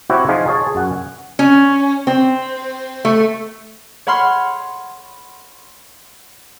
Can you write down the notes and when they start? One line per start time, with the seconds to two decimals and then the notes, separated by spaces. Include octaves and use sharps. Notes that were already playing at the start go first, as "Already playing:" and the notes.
0.10 C4 E4 F#4 G4 C#5
0.28 F3 D#4 F4 G#4
0.48 G#4 C#5 A5
0.75 F#2 F#5 G#5
1.39 C#4
2.07 C4
3.05 A3
4.07 C#5 F#5 B5 C6 F6